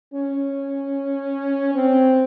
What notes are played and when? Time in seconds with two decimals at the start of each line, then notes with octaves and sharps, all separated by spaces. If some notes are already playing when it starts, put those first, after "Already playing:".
0.14 C#4
1.75 C4